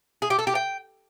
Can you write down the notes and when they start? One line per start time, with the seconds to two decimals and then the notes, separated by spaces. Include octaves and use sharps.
0.22 G#4
0.30 G4
0.39 A4
0.47 G4
0.55 G5